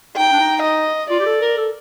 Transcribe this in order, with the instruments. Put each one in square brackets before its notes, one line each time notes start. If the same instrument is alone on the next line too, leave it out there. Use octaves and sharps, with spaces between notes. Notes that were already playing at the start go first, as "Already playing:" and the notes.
[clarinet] D#4 [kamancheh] G5
[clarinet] D4
D#4
[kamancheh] D#5
[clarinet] F4 [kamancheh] D5
[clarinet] G4
A4
A#4
A4